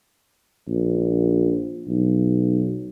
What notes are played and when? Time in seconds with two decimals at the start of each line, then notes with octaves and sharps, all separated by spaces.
0.68 A#1
1.88 B1